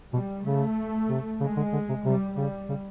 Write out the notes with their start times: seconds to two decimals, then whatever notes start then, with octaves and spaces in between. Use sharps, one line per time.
0.13 B2 G3
0.44 C#3 A3
1.09 C3
1.40 C#3 G#3
1.56 D3
1.73 D3
1.89 C3
2.04 C3 G3
2.37 C#3 G3
2.69 C#3